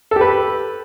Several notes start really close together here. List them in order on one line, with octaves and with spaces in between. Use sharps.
A4 G4 B4